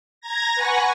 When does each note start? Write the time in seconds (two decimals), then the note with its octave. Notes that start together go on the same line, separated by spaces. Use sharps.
0.21 A#5 G#6 A#6
0.55 B4 F#5 G#5 C#6